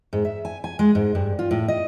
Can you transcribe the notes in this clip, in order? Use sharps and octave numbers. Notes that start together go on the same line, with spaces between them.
G#2
E5
G#5
G#5
G#3
G#2
G2
F4
A2
D#5